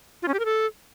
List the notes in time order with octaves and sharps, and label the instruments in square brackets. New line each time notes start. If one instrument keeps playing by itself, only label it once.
[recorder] F4
C#4
G4
A#4
A4